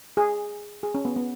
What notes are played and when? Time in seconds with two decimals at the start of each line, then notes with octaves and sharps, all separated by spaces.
0.17 G#4
0.83 G#4
0.95 C#4
1.05 B3
1.16 B3